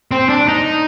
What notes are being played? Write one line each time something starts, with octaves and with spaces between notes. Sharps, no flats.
C4
D4
D#4